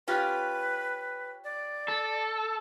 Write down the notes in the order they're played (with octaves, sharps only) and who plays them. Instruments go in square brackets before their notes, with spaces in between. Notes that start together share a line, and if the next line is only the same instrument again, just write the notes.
[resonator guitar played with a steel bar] C#4 F4 G4 [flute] B4
[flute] D5
[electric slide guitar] A4